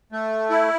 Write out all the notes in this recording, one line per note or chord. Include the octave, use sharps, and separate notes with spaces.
A3
E4